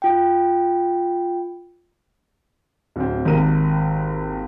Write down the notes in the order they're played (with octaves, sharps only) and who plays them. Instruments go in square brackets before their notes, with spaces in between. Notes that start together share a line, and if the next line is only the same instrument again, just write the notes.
[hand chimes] F4 G5
[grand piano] D1 C4
G#1 D#2 A#4 D#7